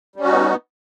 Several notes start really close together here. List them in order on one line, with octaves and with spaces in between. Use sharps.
G3 C#4 F#4 D#4 B3